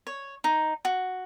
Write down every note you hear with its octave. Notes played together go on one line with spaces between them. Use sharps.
C#5
D#4
F#4